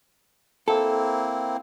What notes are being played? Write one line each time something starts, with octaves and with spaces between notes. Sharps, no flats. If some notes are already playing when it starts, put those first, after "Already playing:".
A#3 C4 E4 A4